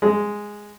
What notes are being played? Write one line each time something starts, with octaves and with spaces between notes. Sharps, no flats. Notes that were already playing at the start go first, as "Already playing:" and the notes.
G#3